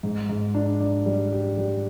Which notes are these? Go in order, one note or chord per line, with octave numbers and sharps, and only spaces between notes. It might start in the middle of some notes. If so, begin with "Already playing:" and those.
G#2
G#2
D4
D4
G3
G4
G3